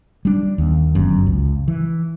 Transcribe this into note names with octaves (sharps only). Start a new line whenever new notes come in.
G3 D4
D#2
G1 F#2
C#2
E3